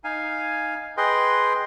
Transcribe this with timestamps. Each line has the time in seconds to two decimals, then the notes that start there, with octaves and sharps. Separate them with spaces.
0.04 D#4 F5 G#5
0.97 G#4 B4 D#5 G5 C6